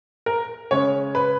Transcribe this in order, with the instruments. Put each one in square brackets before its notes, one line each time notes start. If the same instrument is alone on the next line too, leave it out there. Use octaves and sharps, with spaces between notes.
[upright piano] A#4
C#3 G#3 C#4 C#5
B4